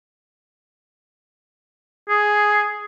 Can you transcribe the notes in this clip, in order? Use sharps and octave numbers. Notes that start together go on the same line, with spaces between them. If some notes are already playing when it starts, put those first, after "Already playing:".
G#4